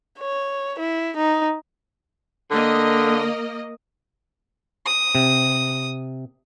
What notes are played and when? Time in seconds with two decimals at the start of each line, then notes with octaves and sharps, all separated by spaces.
0.19 C#5
0.79 E4
1.16 D#4
2.51 D3 A#3 D#5
4.86 D#6
5.15 C3